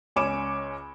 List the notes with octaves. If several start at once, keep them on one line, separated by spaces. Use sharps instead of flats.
C#2 C#4 C#5 D6 E7